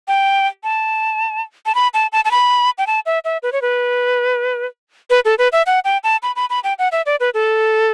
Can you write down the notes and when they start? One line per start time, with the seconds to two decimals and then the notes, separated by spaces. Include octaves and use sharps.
0.08 G5
0.63 A5
1.66 A5
1.75 B5
1.94 A5
2.12 A5
2.25 A5
2.31 B5
2.78 G5
2.87 A5
3.06 E5
3.25 E5
3.43 B4
3.53 C#5
3.62 B4
5.10 B4
5.25 A4
5.38 B4
5.53 E5
5.66 F#5
5.85 G5
6.04 A5
6.23 B5
6.36 B5
6.50 B5
6.64 G5
6.79 F#5
6.92 E5
7.06 D5
7.20 B4
7.34 A4